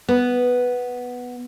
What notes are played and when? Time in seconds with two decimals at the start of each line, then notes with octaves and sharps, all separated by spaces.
0.08 B3